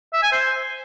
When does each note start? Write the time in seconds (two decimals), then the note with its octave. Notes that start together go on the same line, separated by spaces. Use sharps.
0.14 E5
0.23 G#5
0.32 C5